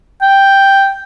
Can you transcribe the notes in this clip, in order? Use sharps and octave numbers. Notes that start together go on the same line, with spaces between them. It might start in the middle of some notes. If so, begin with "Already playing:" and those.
G5